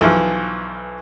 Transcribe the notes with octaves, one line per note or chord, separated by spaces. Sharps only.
B1 E3 F3